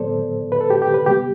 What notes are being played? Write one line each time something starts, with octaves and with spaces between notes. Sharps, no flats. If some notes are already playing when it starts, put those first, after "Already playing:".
Already playing: A2 F#3 B3 A4 C5 D5
B4
A4
G4
G4
B4
C3 G3 B3 G4